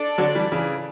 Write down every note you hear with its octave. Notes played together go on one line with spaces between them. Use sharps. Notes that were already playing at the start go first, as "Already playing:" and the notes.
Already playing: D4 A4 D5
D3 F#3
E3 G3
C#3 E3